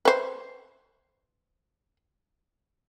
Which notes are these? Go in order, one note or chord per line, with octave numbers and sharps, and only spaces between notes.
B4 C5